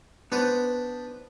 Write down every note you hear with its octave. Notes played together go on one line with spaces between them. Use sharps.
B3 D4 B4 C5